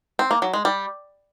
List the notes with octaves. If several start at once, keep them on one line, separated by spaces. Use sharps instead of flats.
C4
A#3
F#3
G#3
G3